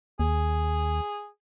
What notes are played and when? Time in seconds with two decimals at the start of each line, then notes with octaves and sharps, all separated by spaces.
0.20 D#2 G#4